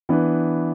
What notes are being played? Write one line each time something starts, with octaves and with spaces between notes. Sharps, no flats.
E3 B3 D4